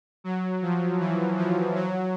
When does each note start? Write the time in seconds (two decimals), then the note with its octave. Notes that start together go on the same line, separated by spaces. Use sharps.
0.24 F#3
0.62 F3
0.99 E3
1.38 F3
1.75 F#3